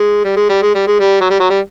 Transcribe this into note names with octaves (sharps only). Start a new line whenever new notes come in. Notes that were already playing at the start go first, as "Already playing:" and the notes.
Already playing: G#3
G3
G#3
G3
G#3
G3
G#3
G3
F#3
G3
F#3
G3